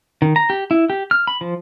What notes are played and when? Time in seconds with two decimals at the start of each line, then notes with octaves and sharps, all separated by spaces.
0.22 D#3
0.36 A#5
0.50 G4
0.71 E4
0.90 G4
1.11 F6
1.27 B5
1.41 F3